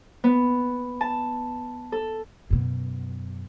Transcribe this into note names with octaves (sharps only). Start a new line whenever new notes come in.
B3
A5
A4
F#2 B2